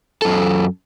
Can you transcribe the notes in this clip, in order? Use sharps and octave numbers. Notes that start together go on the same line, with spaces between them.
F#2 A4